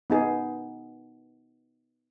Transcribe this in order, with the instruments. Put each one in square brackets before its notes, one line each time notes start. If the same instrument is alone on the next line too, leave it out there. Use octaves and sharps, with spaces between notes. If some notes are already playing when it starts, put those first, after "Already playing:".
[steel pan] B3 D#4 G#4